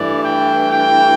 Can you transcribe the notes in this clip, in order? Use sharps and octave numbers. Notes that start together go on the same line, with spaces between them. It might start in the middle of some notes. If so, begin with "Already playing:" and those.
Already playing: G2 E3 A3 D5
G5
G5